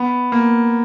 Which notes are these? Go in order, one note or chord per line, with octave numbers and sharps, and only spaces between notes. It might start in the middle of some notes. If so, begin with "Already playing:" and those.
Already playing: B3
A#3